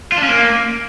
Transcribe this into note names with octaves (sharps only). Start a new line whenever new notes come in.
F4
D4
C#4
A#3